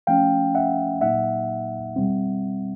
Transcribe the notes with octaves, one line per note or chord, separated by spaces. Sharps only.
F3 A3 C#4 F5 G5
E5 F#5
A#2 F#3 A#3 D#4 E5 F#5
B2 G3 C4